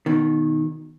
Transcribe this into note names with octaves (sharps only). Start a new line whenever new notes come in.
B2 D#3